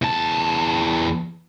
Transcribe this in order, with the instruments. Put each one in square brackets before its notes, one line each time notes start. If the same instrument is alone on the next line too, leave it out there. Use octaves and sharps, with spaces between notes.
[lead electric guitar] E2 A5